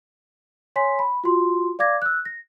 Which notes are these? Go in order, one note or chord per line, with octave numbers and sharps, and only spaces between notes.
C#5 G#5 C6 B6
B5
F4 F#4 C6
D5 F5 D6 G#6 A#6
E6 F#6
A#6